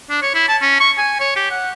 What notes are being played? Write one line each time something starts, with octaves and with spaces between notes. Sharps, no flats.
D4
C#5
E4
A5
C#4
C#6
G#5
C#5
G4
F#5